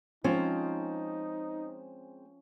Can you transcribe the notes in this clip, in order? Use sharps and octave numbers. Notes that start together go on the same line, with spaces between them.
F3 G#3 C4 C#4 D#4 C5